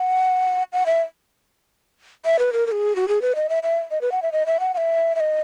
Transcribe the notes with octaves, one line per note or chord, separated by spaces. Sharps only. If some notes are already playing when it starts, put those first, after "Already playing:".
Already playing: F#5
F#5
E5
E5
B4
A#4
A#4
G#4
F#4
G#4
B4
D#5
E5
E5
D#5
B4
F#5
E5
D#5
E5
F#5
F#5
E5
E5
D#5